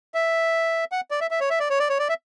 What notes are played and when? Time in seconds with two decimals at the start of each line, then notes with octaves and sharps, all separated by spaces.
0.14 E5
0.92 F#5
1.11 D5
1.21 E5
1.31 E5
1.41 C#5
1.50 E5
1.60 D5
1.70 C#5
1.80 D5
1.89 C#5
1.99 D5
2.09 E5